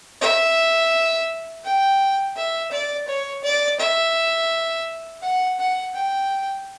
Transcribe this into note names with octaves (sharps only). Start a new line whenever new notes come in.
E5
G5
E5
D5
C#5
D5
E5
F#5
F#5
G5